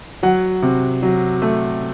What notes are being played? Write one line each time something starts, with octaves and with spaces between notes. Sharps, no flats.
F#3 F#5
C3
F#3
A3